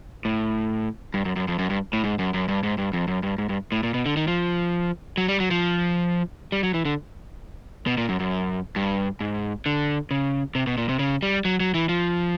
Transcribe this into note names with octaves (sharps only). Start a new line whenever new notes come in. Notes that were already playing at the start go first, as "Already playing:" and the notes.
A2
G2
F#2
F#2
F2
F#2
G2
A2
G#2
F#2
F#2
G2
G#2
G2
F2
F#2
G2
G#2
G2
A2
A#2
B2
D3
D#3
F3
F#3
G3
F#3
F3
G3
F#3
E3
D3
B2
A#2
F#2
F#2
G2
G#2
D3
C#3
C3
B2
A#2
C3
C#3
G3
F#3
F#3
E3
F3